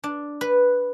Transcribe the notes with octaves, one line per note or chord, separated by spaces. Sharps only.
D4
B4